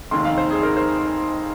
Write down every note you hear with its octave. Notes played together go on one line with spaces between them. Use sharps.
F1 D#2 D#3 C6
F5
C5
G#4
A#4
C5